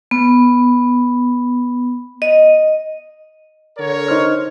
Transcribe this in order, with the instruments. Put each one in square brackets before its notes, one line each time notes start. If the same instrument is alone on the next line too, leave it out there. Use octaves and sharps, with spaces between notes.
[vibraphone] B3
D#5
[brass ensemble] D3 A#4 C#5
[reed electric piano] D#4 C5 F6